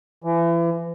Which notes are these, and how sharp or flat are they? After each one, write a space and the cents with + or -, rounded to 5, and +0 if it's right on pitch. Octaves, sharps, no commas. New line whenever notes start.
E3 +35